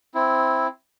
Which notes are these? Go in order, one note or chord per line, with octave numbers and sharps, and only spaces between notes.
C4 E4